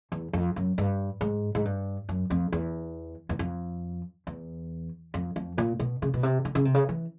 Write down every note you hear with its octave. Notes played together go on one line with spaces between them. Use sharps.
E2
F2
F#2
G2
G#2
G#2
G2
F#2
F2
E2
E2
F2
E2
F2
F2
A#2
B2
C#3
B2
C3
D3
C#3
C3
C#3
E3